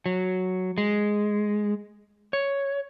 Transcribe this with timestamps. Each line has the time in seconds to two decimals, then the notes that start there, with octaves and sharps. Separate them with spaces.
0.06 F#3
0.78 G#3
2.33 C#5